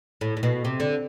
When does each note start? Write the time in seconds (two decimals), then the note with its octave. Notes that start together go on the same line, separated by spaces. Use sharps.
0.21 A2
0.37 A2
0.43 B2
0.65 C3
0.80 D3